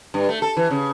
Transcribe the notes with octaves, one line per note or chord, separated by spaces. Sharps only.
G2
A3
A4
E3
C#3